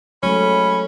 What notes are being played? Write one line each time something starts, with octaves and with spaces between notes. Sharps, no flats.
F#3 G#3 A3 C#4 B5